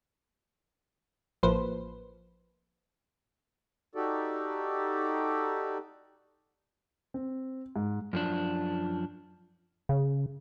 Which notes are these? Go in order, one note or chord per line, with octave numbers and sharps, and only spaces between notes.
A1 F3 A#3 B4 C5
D#4 F#4 G4 A4 D5
C4
G#2
F#2 F3 D4
C#3